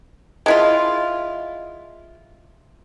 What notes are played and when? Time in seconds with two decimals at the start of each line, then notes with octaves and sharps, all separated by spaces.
0.46 G#3 E4 F4